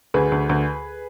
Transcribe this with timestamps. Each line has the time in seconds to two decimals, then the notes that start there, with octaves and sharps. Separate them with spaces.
0.14 D2 G#4 B4
0.32 D2
0.49 D2